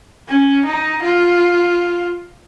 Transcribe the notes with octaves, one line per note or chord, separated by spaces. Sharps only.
C#4
D#4
F4